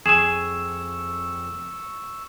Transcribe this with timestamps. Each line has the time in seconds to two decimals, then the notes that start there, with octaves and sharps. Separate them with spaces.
0.06 F2 G#4 G#5 C#6 E6 E7